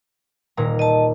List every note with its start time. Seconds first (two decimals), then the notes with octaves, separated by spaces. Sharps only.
0.57 D#1 A#2 A#5
0.79 D#5 A5